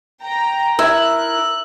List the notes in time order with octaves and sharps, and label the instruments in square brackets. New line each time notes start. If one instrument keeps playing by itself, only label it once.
[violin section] G5 A#5
[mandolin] E4 [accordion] A#4 [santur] E5 [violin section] F#6